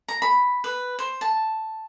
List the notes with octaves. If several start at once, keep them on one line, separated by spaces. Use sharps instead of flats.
A#5
B5
B4
C5
A5